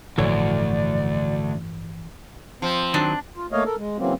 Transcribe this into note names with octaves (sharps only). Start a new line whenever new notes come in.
G1 D2 A2 E3 F3 A4 C#5 D5
F3 C4
D#3 F#3 D4
F4
A3 A#3 C#5 D#5 F5
A4 A#4
G#3
C#3 E3 F#3 A#3 C4